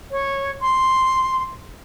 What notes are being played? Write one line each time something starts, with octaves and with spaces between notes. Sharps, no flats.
C#5
C6